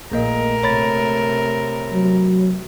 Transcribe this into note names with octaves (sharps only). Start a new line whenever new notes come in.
A#1 A#2 A3 A#3 A#4 D#5
C3 C#5 B5 A6
F#3